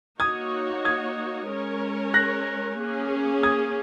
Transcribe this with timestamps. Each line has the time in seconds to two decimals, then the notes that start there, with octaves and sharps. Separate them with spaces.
0.20 A#3 D#4 F#4 C#5 D#6 G#6
0.85 D#6 G#6
1.50 G#3 C#4 A#4 C#5
2.14 F#6 A#6
2.79 A#3 C#4 G#4
3.43 D#6 G#6